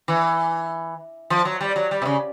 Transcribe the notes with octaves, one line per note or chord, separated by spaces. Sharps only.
E3
F3
F#3
G3
F#3
G3
C3
C#3